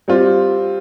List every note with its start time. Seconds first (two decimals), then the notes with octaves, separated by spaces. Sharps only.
0.08 G3 C4 F4